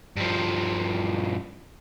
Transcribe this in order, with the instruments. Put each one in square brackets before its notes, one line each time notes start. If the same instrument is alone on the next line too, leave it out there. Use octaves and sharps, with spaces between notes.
[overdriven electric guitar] G2 F3